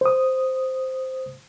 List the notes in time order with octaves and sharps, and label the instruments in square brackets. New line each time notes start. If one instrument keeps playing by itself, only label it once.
[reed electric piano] C5 D#6